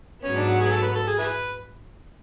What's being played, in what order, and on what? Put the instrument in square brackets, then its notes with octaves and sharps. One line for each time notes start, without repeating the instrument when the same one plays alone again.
[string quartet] G#2 F#3 B3 [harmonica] C#4
[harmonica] D4
F#4
G#4
A4
B4
A4
G#4
E4 G#4 B4